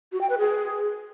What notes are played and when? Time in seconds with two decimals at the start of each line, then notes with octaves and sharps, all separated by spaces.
0.12 F#4
0.21 G5
0.30 B4
0.38 G#4